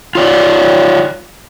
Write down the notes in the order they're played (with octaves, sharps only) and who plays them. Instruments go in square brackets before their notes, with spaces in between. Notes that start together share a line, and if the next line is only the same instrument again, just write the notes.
[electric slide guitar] F4 C#5 D5